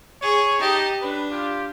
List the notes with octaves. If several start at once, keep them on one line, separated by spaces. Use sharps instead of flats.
G#4 C#5
D#4 G4 D#5 A5
D4 B4
F4 G4